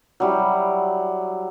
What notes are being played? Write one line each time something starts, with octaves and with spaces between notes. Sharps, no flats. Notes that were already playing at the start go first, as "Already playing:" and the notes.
F#3 G3 E4